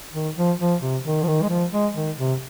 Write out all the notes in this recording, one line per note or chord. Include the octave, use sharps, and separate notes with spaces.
D#3
F3
F3
C3
D#3
F3
D#3
G#3
F3
G#3
D#3
C3